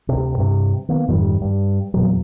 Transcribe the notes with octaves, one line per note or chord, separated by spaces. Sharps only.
D2 C3
G2 C3
D#3 A#3 B3
F2 G#2 D#3 G3
G2
E2 A#2 F#3